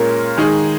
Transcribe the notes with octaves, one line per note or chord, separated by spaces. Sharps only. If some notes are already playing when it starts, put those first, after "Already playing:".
Already playing: A#2 G#3 C#4 A#4
D#3 G#3 D#4 G#4